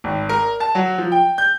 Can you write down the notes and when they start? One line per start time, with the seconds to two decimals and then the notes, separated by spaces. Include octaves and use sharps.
0.04 G#1
0.29 A#4
0.60 A5
0.75 F#3
0.98 F3
1.12 G5
1.38 G6